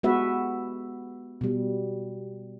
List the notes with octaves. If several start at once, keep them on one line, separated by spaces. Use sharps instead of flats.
G#3 B3 F#4 B4 E5
B2 G3